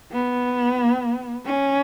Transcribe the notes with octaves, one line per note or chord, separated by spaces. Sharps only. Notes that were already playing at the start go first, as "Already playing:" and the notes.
B3
C#4